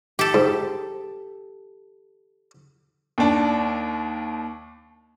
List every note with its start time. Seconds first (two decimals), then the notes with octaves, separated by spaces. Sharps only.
0.19 G4 A4
0.34 G#2
3.18 D#2 D4